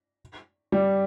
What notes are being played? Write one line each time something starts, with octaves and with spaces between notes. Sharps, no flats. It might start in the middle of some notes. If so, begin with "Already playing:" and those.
G3